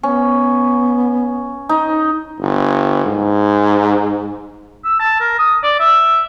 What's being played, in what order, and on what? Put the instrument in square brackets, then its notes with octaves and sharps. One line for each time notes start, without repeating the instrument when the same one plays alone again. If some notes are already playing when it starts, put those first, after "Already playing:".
[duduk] B3 [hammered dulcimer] C#4
[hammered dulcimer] D#4
[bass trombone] G1
G#2
[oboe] E6
A5
A#4
D#6
D5
E5